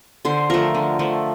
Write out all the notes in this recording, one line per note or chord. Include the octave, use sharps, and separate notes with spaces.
D3 C5
F3 A3 A#4
D3
F3 A3